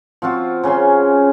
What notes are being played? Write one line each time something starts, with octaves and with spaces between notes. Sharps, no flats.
F3 C4 F4 F#4
C#3 C#4 G#5 C6